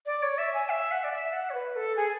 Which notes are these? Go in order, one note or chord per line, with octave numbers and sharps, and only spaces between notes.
D5
C#5
E5
G#5
E5
F#5
D5
E5
F#5
C#5
B4
A4
G#4